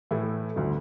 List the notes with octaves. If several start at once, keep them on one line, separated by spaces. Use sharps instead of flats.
A2 E3 A3 E4 A4
G1 D2